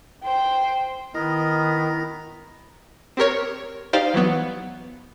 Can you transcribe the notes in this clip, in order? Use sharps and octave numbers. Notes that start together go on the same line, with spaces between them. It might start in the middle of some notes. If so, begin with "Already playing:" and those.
C5 G5
D#3 B3 E4 A#4 D#5 A#5 A#6
C4 G4 A#4 C#5
D#4 G4 C5 D5 F5
E3 F#3 B3